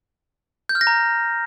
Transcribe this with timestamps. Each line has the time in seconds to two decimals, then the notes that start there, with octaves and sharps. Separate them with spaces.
0.69 G6
0.75 F6
0.81 A#6
0.87 A#5